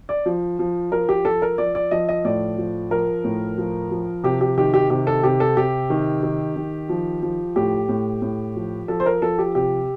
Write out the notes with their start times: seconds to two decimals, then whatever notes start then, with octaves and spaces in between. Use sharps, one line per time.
0.09 D5
0.26 F3
0.59 F3
0.92 F3 A#4
1.09 G4
1.25 F3 A4
1.42 A#4
1.58 F3 D5
1.75 D5
1.91 F3 D#5
2.09 D#5
2.25 A2 D5
2.58 F3
2.91 F3 A#4
3.24 A2
3.58 F3
3.91 F3
4.24 C3 G4
4.41 G4
4.57 D#3 G4
4.74 G4
4.90 C3 G4
5.07 A4
5.23 C3 G4
5.40 A4
5.57 C3 G4
5.90 D#3
6.23 D#3
6.56 D#3
6.89 F3
7.22 F3
7.56 A2 G4
7.89 A2
8.22 A2
8.56 F3
8.88 F3 A4
9.00 C5
9.06 A#4
9.22 F3 A4
9.38 G4
9.55 C3 G4